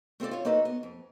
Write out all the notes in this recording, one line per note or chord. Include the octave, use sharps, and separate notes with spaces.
A3 C4 F4 A4 D5
F4 C#5
A#3 D#4 F#4 A4 B4
B3
F2